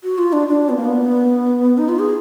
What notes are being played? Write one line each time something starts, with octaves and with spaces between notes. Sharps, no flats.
F#4
F4
D4
D4
B3
A#3
B3
D#4
F4
G#4